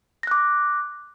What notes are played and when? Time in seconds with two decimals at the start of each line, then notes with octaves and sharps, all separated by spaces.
0.23 A#6
0.27 F#6
0.31 D6